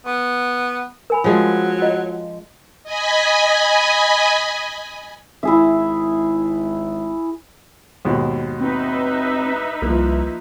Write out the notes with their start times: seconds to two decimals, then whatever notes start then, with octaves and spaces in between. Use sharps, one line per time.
0.06 B3 C#6
1.10 A#4 G#5 B5
1.24 F3 F#3 G#3 C#4
1.82 F4 D#5 F5
2.83 D#5 G#5 B5
5.43 G#1 E4 G#4 E5
8.05 D#2 G#2 B2
8.61 C4 D#4 B4 E5
9.82 C2 F3 A#3